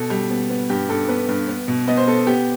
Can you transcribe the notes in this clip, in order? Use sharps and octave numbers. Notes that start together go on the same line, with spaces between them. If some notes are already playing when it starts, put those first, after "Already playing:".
Already playing: B2 A4
G3
B3
B3
G2 G4
G2 A4
B3 B4
G2
B3
B2
B3 D#5
C5
B3 A4
B3 G4